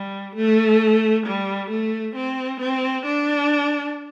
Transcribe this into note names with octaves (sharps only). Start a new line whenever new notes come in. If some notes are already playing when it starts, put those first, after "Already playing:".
Already playing: G3
A3
G3
A3
C4
C4
D4